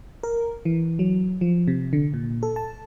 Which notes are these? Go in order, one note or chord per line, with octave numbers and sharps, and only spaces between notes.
A#4
E3
F#3
F3
C3
D3
A#2
A4
A5